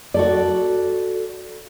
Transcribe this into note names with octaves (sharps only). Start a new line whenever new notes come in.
F#4 A4 D5